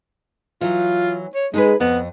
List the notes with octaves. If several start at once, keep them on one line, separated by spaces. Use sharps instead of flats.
E3 F#3 F4
C#5
G#3 D#4 G#4 B4
F2 B3